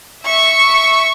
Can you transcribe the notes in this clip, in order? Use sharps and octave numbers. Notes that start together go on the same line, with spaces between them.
E5 C#6